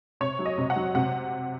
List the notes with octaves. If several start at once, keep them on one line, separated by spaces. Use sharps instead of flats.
C3 C#5
F#3
D#5
C3
F#5
F#3
C3 F#5